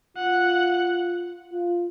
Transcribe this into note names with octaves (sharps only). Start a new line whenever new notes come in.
F4 F#5
F4